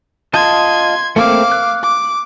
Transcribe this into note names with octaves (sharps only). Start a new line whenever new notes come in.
F4 D#5 A5 C6 G#6
A3 A#3 C4 F5 D6
F#6
D6